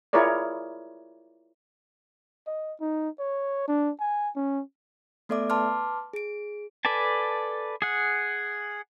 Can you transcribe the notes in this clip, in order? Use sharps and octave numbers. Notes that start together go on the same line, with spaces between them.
E4 F4 G#4 A#4 C#5 D5
D#5
D#4
C#5
D4
G#5
C#4
A3 B3 A4 D5 E5 D6
B4 A5 C6 D6 F6
G#4 D7
A4 B4 D5 G#5 A5
G#4 F#5